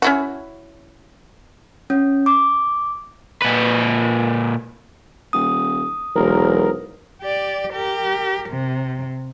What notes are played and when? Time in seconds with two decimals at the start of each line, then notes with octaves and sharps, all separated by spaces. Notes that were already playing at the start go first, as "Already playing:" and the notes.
0.02 C#4 E4 F#4
1.90 C#4
2.26 D6
3.42 A#2 B4
5.33 D#1 D#6
6.15 E1 B1 A#4
7.22 G4 D5
7.72 G4 A#4
8.49 C3